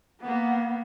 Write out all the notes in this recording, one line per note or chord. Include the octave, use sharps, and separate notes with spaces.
A#3 B3